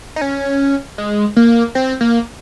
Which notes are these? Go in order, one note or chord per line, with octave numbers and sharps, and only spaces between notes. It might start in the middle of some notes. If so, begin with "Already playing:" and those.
D#4
C#4
G#3
A#3
C4
A#3